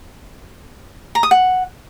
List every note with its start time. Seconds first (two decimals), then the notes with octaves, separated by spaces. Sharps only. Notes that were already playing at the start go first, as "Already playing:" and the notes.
1.15 A#5
1.23 D#6
1.31 F#5